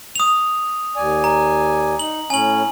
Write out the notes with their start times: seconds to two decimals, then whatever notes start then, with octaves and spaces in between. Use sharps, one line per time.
0.16 D#6 F7
0.96 D#2 D5 G#5
1.24 A#5
1.99 D#4 F#7
2.30 A2 C#4 G#5 F#7